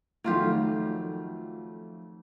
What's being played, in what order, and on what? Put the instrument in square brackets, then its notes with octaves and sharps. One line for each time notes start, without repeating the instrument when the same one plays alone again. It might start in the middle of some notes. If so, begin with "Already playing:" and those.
[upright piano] F2 D#3 A3 [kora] F#3 F4 G4